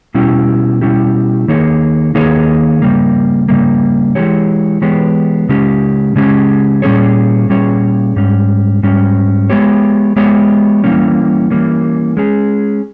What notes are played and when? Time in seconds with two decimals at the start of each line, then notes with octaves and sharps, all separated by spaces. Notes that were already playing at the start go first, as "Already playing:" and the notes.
0.14 B2 G3 C#4 E4 G4
0.81 B2 G3 C#4 E4 G4
1.48 D#3 A#3 D#4 G#4 C#5
2.15 D#3 A#3 D#4 G#4 C#5
2.82 C#3 G3 A#3
3.48 C#3 G3 A#3
4.15 E3 G#3 B3 G4 C#5
4.82 E3 G#3 B3 G4 C#5
5.49 C#3 G#3 C#4 G4
6.16 C#3 G#3 C#4 G4
6.82 A#2 G3 C#4 G#4 C#5
7.49 A#2 G3 C#4 G#4 C#5
8.16 G#2 G3 C#4
8.83 G#2 G3 C#4
9.50 G#3 B3 G4 C#5
10.16 G#3 B3 G4 C#5
10.84 E3 G3 A#3 C#4
11.50 E3 G3 A#3 C#4
12.17 G#3 C#4 G#4